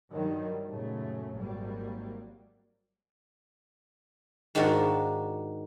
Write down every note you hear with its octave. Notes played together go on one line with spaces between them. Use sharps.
G2 D#3 F#3 G3
F#2 A#2 C#3 F#3 A3
G#1 F#3 G3 A#3
G#2 D#3 D4 F4 F#4